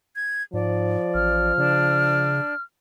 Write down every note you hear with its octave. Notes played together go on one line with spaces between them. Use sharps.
G#6
G#2 F3 D5
A1 F6
C#3 D4